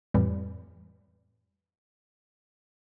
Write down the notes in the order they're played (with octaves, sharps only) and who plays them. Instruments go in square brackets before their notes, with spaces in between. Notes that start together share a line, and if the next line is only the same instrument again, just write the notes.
[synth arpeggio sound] F2 A2 E3 G3